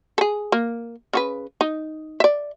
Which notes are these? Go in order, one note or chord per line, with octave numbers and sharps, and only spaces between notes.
G#4 A4
A#3
C#3 F#4 B4
D#4
D5 E5